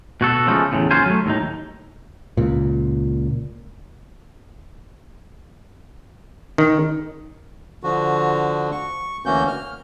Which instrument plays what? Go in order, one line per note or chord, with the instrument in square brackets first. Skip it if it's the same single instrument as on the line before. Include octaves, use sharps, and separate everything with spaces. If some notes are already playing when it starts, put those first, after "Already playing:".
[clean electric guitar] B2 F#4 A4
C#3 F3 G#3 A3
E2 A2 C#3
D#2 F#3 C#4 F4 C5 G#5
F#3 A3
D#2 A2 D#4
[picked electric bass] C#2 A#2
[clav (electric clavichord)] D#3
[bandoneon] D3 F3 F#4
C#6
D2 E3 A#3 C#4 F#4 G6
F6